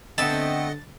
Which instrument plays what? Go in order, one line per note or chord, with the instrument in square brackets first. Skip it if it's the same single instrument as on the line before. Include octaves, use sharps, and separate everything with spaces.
[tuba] D3 [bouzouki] A3 B3 C4 [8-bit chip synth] D#5 F#5 [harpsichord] A5